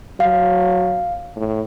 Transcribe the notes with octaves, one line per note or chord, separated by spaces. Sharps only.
F#3 F5
A2